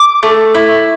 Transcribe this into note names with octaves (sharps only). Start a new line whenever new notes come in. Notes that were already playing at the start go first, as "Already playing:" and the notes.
Already playing: D6
A3
E4